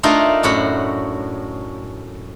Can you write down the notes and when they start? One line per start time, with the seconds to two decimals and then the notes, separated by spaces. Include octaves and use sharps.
0.03 A3 D4 D#4 F4 A#4 D#5
0.43 F#2 A2 F#4 F#5 B5